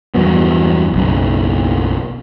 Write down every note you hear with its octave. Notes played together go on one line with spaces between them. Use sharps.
E2 G2 F#3 B3
F#1 B1